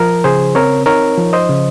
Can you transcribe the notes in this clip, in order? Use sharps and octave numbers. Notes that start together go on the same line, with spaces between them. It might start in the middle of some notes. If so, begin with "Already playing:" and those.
Already playing: F3 A#4
C#3 G#4 C5
C4 A#4 C#5
D#4 A#4 C#5
F3
C5 D#5
C#3